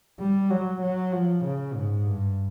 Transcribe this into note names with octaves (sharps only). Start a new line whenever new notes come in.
G3
F#3
F#3
F3
C#3
G#2
G2